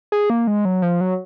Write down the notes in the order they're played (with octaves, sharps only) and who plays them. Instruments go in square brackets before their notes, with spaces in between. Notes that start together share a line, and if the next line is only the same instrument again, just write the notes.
[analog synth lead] G#4
A#3
G#3
F#3
F3
F#3